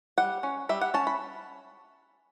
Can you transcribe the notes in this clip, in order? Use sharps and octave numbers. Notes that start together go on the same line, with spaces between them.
G3 F#5
C#4
G3 E5
F#5
C#4 A5
B5